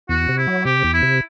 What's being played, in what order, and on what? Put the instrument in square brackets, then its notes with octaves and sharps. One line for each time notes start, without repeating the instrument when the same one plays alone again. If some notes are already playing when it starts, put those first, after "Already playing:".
[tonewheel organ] E2 [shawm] F#4
[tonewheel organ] C3
[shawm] E4
[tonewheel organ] F#3
[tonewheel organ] C3 [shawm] G4
[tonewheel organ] E2
[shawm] E4
[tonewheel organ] C3